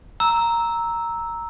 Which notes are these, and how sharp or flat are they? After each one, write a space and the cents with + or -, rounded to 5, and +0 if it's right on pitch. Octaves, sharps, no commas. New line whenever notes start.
A#5 +0 E6 -10